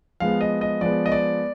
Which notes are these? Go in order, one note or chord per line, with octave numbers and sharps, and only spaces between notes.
F3 G#3 B3 F5
D#5
D#5
F3 G#3 B3 D5
D#5
D5